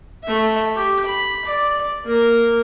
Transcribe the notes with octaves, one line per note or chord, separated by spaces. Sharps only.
A3 E5
G4
B5
D5
A#3 A#4